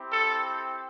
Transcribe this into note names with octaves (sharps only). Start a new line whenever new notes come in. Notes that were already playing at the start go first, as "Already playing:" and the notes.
Already playing: C4 E4 G4
A4